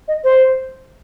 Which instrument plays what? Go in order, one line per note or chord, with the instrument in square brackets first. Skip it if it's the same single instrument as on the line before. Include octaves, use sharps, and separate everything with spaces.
[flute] D#5
C5